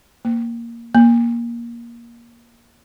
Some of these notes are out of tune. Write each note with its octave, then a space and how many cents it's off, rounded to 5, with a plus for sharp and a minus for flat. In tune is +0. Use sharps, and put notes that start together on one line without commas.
A#3 +0
A#3 +15